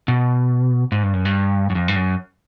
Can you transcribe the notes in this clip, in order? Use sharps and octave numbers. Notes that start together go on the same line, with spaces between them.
B2
G#2
G2
F#2
G2
F#2
F2
G2
F#2